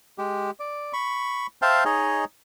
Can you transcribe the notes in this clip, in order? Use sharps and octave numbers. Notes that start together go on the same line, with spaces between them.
G#3 G4
D5
B5 C#6
C5 E5 F5 G5 A5
D#4 G#4 C#5 D#5